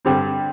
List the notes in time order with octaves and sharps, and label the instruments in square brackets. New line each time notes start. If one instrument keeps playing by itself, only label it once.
[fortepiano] G2 D3 G3 C4